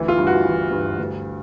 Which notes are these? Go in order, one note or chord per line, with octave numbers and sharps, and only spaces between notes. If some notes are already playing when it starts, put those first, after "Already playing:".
Already playing: D2 E3
F4
G2
F#4
E3
G2
D2